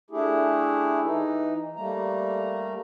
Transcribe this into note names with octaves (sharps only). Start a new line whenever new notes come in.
A3 D4 E4 G4 G#4
E3 D#4
G3 A3 A#3 A#5